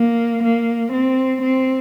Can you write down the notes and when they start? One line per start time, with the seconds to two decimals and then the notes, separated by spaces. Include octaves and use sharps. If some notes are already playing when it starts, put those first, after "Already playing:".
Already playing: A#3
0.44 A#3
0.93 C4
1.42 C4